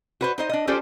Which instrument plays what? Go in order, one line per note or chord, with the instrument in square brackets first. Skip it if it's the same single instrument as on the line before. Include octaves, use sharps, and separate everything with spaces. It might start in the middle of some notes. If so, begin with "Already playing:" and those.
[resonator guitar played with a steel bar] F#4 B4 C5
D#4 C5 D#5
D4 D#5
C#4 F4 G4 A4 C5 D5